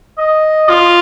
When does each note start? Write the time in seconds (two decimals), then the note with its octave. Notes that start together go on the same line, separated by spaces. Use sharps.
0.18 D#5
0.69 F4